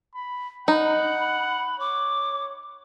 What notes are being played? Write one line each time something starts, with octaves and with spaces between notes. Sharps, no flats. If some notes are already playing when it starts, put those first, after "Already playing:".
B5
D#4 F#5 B5
C#5 D6